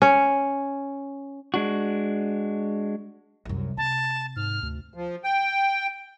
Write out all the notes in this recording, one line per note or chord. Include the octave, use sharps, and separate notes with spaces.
C#4
G#3 D4 F#4
C2 F#2
C3 A5
G#2 F6
D2
F3
G5